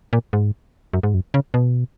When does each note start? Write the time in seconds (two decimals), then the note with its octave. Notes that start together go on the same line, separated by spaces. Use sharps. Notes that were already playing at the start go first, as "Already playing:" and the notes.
0.13 A#2
0.33 G#2
0.93 F#2
1.03 G#2
1.14 F#2
1.34 C#3
1.54 B2